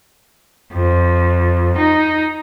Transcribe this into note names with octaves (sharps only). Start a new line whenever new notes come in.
F2
D#4